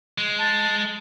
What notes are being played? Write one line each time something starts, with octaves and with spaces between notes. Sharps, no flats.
G#3
A5